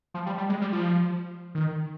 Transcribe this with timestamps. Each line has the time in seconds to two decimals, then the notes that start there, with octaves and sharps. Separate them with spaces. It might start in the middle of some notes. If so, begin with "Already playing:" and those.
0.14 F3
0.26 G3
0.38 G3
0.49 G#3
0.61 G3
0.72 F3
1.55 D#3